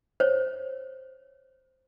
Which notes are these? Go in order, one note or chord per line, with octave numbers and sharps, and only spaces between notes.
C5 C#5